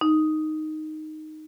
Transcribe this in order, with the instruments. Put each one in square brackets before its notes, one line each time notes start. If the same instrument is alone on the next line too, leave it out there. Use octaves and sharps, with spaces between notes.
[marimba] D#4